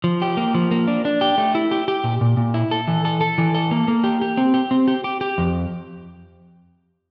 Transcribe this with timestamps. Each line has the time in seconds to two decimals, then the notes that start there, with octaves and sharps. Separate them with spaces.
0.04 F3
0.22 G4
0.37 A#3
0.55 F3
0.71 A#3
0.87 D4
1.05 D4
1.21 G4
1.38 A3
1.55 E4
1.71 G4
1.88 G4
2.04 A#2
2.21 A#2
2.37 A#2
2.54 E4
2.71 A4
2.88 E3
3.05 A4
3.21 A4
3.38 E3
3.54 A4
3.71 A#3
3.88 A#3
4.04 G4
4.21 G4
4.37 C4
4.54 G4
4.71 C4
4.88 G4
5.04 G4
5.21 G4
5.38 F2